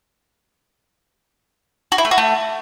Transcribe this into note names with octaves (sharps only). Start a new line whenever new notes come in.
F#4
E4
A3
F#4
A3